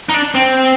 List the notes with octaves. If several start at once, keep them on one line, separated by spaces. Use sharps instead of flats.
D#4
D4
C4